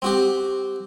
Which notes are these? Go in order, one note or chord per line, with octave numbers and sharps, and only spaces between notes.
C4 F#4 G4